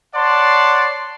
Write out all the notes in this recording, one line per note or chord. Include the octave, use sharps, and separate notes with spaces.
C#5 D5 F#5 A5 C6